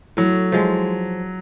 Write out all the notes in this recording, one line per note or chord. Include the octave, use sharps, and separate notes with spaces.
A2 F#3
F3 G#3